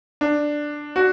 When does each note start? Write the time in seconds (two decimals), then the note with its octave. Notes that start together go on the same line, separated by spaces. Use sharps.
0.21 D4
0.96 F#4